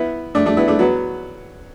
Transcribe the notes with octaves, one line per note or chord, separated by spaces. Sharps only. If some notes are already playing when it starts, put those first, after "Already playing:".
Already playing: B3 E4
A3 D4
A3 D4
B3 E4
A3 D4
F#3 B3